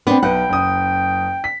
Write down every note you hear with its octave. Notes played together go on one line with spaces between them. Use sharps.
B3 C4 D4
B1 B4 F#5 G5
F#1 D#6
B6